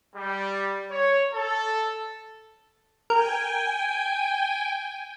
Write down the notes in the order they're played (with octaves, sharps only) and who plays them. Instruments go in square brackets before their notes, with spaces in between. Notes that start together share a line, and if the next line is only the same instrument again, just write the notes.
[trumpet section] G3
C#5
A4
[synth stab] A#4 [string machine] G5 G#5